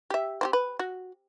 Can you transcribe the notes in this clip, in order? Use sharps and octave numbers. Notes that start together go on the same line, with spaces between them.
G4 E5
C4 F4 G4
B4
F#4